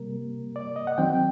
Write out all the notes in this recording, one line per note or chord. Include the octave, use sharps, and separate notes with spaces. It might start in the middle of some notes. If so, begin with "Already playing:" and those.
Already playing: C3 G3 A#3 A#4
D5
D#5
F#5
D#3 F#3 C4 G5
G5